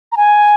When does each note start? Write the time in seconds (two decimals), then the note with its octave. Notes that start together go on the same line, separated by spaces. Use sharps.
0.12 A#5
0.17 G#5